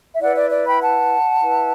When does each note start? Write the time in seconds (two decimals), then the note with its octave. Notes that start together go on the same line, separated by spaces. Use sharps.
0.14 E5
0.21 E4 B4 D5 F#5
0.36 D5
0.50 D5
0.66 G5 B5
0.80 F#5 A5
1.41 E4 B4